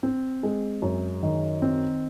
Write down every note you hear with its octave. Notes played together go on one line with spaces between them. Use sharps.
C4
G#3
F#2
D#3
C4